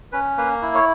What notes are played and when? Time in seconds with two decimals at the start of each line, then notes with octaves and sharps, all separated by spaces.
0.12 C#4 B4
0.37 A#3 B4
0.62 E4
0.74 C#5